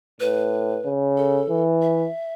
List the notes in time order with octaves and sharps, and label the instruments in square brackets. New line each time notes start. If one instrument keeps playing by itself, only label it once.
[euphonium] A2 [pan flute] B4
[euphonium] C#3
[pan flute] A4
[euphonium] E3
[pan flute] E5